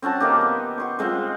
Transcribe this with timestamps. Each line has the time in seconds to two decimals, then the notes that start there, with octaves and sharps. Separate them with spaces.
0.02 C4 C#4 F#4 A5
0.20 D#3 A#3 D#4 G4
0.41 B3
0.78 F#5 C6 C#6
0.99 G#3 C4 F4 F#5